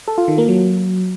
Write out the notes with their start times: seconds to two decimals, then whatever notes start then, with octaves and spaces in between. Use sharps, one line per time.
0.08 A4
0.18 F4
0.28 D#3
0.38 A#3
0.48 F#3